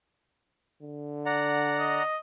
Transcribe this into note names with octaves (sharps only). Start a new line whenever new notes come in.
D3
D5 F#5 A#5
D#5